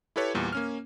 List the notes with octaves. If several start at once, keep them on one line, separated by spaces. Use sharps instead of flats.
E4 G4 A4 B4 C#5
E2 A#2 G3
A#3 C#4 F6